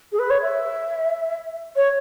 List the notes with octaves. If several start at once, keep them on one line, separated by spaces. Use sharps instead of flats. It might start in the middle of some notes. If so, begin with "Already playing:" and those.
G#4
B4
C#5
E5
C#5